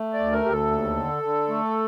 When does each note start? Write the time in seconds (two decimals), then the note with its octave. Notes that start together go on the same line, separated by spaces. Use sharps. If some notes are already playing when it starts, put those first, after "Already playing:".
Already playing: A3
0.13 D5
0.19 D2
0.32 A#4
0.45 D2 G4
0.52 A4
0.71 D#2
0.96 D3
1.23 D3
1.48 A3